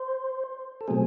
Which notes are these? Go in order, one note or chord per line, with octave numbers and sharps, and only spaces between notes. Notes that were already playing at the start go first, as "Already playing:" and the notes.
Already playing: C5
A4
B2 F#3 A3 C4 G#4